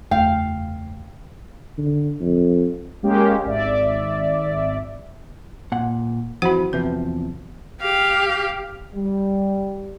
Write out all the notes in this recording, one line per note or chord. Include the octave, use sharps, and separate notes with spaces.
F#1 E2 A3 F5 G5
D3
F2
G#3 A#3 C#4 G4
G#1 D5 E5
A#2 F#5
F2 E3 F#4 C5 F#5 B5
E2 C3 F3 B4
G4 F5
G3